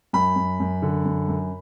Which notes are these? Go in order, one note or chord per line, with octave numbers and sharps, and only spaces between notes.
F#2 B5
F#2
F#2
D3
F#2
F#2